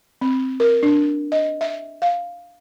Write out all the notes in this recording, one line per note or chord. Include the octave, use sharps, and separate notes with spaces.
C4
A#4
D4
D#5
E5
F5